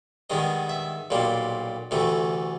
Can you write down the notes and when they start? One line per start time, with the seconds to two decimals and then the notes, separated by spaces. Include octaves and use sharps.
0.30 G2 D#3 G#3 B3 D#5
0.69 E5
1.10 B1 A#2 G3 A#3
1.91 D2 C3 E3 A3